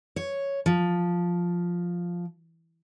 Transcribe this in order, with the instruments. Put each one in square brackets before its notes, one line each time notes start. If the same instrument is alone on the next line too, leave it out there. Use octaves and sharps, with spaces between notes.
[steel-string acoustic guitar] C#5
F3